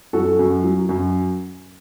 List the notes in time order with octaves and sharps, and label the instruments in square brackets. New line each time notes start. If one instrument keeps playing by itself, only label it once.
[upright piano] F#2 F#4 A4
F#2
F#3
F#2